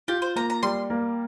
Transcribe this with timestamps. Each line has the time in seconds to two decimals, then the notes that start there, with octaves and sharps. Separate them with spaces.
0.08 F4 G4
0.22 C5
0.36 A#3 A#5
0.50 A#5
0.63 G3 C6
0.90 A#3